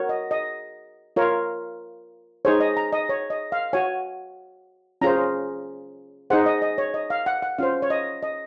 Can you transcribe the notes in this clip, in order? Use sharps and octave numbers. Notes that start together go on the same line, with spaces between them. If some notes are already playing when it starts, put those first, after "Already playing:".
Already playing: F#4 A#4 C#5
D#5
D#5
F4 A#4 C#5
D#4 G#4 C5 C#5
D#5
A#5
D#5
C#5
D#5
F5
F#4 C#5 G#5
C#4 F4 G#4 C5 A#5
D#4 G#4 C5 F#5
D#5
D#5
C#5
D#5
F5
F#5
F#5
C#4 F4 C5 F5
C#5
D#5
D#5